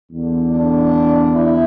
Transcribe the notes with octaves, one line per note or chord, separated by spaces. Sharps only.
E2 D3
D4
E4